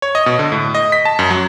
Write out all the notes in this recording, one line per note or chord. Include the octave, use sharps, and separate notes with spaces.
C#5
D#5
B2
D3
A2
D#5
B6
A5
F#2
F#3